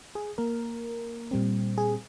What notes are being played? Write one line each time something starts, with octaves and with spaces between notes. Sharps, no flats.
G#4
A#3 A#4
A#2 G3 C4
G#4